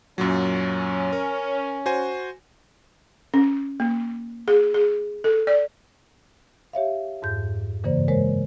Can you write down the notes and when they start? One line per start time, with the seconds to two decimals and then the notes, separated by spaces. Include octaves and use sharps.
0.18 F#2 A#2 F#3 C#4
1.13 A#4
1.86 F#4 C5 G#5
3.34 C#4
3.80 A#3
4.48 G#4
4.74 G#4
5.24 A4
5.47 D5
6.73 G4 C#5 E5 F5
7.22 F2 G#2 G6
7.84 G2 C#3 E3 A#3 C5 D5
8.08 G#3 A#4 C5 C#5